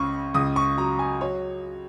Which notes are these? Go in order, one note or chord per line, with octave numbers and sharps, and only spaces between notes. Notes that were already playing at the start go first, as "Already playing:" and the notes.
Already playing: C#2 C#3 C#6
C#2 D#6
C#6
F#3 A#5
G#5
F#3 C#5